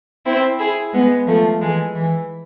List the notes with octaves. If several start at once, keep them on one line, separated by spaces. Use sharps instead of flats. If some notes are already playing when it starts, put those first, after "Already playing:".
C4 E4
E4 G#4
G#3 B3
F3 A3
E3 G#3
E3